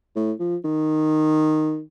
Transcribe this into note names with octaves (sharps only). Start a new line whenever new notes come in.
A2
F3
D#3